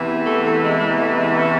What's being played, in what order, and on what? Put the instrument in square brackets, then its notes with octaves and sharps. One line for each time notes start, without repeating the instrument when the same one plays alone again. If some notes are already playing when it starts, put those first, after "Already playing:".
Already playing: [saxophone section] E2 C3 E3
A3
A3
G#3
G#3
A3
G#3
C#4